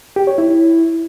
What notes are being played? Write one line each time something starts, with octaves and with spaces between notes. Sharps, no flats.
G4
C#5
E4